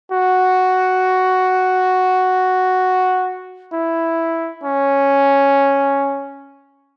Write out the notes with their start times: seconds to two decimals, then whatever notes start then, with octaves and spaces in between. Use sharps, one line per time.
0.12 F#4
3.73 E4
4.64 C#4